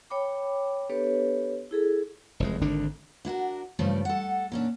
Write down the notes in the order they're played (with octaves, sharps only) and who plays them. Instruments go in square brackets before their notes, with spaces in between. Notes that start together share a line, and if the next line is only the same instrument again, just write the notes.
[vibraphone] C#5 G5 B5 D6
B3 D4 G4 A4 B4 C#5
E4 G#4 A4
[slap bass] F1 E2 G#3
G#1 D3 D#3 D4
[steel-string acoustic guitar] D4 E4 F#4 A#4
G2 C#3 F3 G3 A3 D5
A4 F#5
A#2 C#4 D4